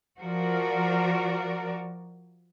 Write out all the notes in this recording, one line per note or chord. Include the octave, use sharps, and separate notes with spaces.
F3 F#4 A#4 D5